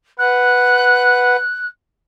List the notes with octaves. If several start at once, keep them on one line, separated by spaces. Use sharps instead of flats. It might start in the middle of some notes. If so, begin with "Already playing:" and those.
B4 F#5 F#6